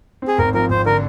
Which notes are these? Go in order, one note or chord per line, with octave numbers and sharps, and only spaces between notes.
C4
G#4
G#1 A#4
F3 A#4
G#1 C5
D3 A#4